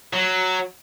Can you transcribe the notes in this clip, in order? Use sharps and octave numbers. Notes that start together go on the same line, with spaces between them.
F#3